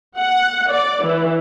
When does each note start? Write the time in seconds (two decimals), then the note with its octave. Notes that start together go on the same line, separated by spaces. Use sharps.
0.17 F#5
0.71 D5
1.02 E3